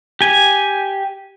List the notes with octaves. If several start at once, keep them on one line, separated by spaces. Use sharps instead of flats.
G4 G#5